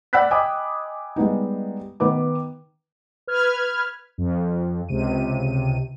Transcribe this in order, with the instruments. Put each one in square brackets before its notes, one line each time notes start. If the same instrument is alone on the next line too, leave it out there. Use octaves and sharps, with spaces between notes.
[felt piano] D5 F#5 B5 E6 F#6 B6
D#5 G5 G#5 B5 D6 D#6
G3 G#3 B3 D#4
D#3 B3 B4 D6
[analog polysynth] B4 F6 G#6
F2
C#2 C3 D#7